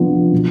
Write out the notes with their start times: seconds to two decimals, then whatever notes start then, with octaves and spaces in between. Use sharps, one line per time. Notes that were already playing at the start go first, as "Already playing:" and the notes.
Already playing: C3 F3 B3 D4
0.32 B2